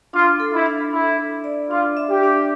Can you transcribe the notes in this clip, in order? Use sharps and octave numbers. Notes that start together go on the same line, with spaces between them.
D4 F4
A4
E4
D4
D4 E4
A4
D5
D4 F4
E5
G4
D4